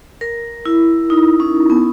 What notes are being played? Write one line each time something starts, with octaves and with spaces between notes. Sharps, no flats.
A#4
E4
D#4
C#4
B3